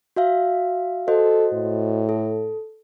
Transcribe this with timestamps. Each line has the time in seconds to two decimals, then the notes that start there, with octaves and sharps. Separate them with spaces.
0.16 F#4 E5 F5
1.08 F#4 A4 C5 D#5
1.53 A2
2.09 A4